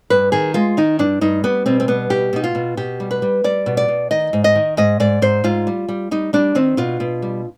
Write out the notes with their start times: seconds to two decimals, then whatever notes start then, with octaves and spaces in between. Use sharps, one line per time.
0.10 G2 B4
0.32 D#3 G#4
0.54 G#3 F4
0.77 D#3 D#4
0.99 G2 D4
1.21 G2 D#4
1.44 G3 B3
1.66 B2 C4
1.80 C4
1.88 G3 B3
2.10 B2 G4
2.33 B2 D#4
2.44 F4
2.55 B2
2.77 B2 G4
3.00 G3
3.11 B4
3.22 G3
3.44 G3 D5
3.66 B2
3.77 D5
3.88 B2
4.11 D#3 D#5
4.33 G#2
4.44 D#5
4.55 D#3
4.77 G#2 D#5
5.00 G#2 D5
5.22 G#2 C5
5.44 G#2 F4
5.67 G3
5.89 G3
6.11 G3 D#4
6.33 G3 D4
6.55 D#3 C4
6.77 B2 F4
7.00 B2
7.22 G3